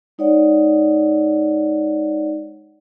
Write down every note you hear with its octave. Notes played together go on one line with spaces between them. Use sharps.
G#3 D#4 C#5 D5 F#5